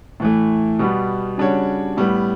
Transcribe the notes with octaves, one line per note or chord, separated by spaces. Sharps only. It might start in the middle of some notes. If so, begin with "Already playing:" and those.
A2 E3 A3
B2 G3 B3
C#3 G3 D4 F#4 C#5
A2 G3 B3